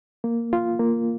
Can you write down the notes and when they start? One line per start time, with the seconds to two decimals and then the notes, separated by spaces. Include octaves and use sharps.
0.24 A#3
0.53 F4
0.79 A#3